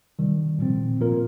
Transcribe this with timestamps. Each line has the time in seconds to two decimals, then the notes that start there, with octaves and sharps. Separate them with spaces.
0.19 C3 D#3 G3
0.59 A#2 F3 C4
1.00 A#2 F3 A#3 F4 A#4